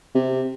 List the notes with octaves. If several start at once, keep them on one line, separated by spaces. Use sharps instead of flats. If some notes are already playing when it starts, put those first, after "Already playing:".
C3